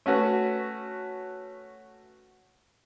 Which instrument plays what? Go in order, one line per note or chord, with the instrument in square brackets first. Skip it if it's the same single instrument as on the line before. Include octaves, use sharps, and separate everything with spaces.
[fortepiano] A3 C#4 F#4 B4